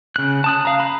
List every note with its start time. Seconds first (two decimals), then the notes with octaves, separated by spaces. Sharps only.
0.16 C#3 F#6
0.44 A5 D#6 F#6
0.65 F5 A#5
0.80 B5 F#6